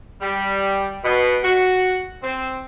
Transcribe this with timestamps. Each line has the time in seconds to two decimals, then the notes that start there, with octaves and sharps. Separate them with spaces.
0.21 G3
1.04 B2
1.42 F#4
2.22 C4